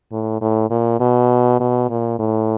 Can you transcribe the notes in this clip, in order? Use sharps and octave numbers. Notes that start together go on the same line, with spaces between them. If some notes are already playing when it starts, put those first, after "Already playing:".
A2
A2
A#2
B2
B2
A#2
A2